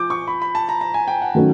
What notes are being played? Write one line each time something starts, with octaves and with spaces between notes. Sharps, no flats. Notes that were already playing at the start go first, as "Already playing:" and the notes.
Already playing: F3 D6 G6
C#6
B5
B5
A5
A#5
A#5
G#5
G5
F#5
D#3 F#3 A3 C#4